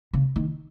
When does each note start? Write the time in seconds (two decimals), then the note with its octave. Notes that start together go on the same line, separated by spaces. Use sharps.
0.13 C#3
0.36 D#3